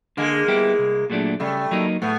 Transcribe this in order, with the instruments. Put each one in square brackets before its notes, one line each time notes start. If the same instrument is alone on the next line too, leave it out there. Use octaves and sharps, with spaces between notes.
[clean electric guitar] D3 [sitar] G#3 A#3
[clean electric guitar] G3 B3 E4 G4
C2
A#2 F#3 A3 D4
[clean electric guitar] C#3 [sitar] G3 A3
[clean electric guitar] F#3 A#3 D#4
[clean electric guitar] A2 [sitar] A3 B3